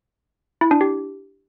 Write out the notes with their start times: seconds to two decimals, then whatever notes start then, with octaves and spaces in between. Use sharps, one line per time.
0.61 E4
0.71 D4
0.81 G4